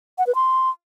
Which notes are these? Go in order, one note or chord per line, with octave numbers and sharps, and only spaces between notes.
F#5
B4
C6